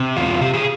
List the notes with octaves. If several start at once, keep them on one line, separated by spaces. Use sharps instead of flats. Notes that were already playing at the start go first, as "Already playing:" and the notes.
Already playing: C3
E2 F4
C3 G4
G#4